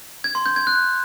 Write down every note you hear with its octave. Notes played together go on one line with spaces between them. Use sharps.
G#6
C6
G6
G#6
F#6